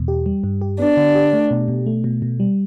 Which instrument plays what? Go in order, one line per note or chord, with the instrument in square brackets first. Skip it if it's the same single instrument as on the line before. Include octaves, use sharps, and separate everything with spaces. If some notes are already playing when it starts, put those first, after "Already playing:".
Already playing: [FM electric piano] E2 B2
G4
G3
G2
G4
[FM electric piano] B3 [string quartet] D4
[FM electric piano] D3
G4
A3
B2
B2
A3
B2
B2
G3